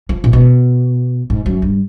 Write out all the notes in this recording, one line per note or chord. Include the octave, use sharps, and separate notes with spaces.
F3
A#2
B2
G#2
F#2
G2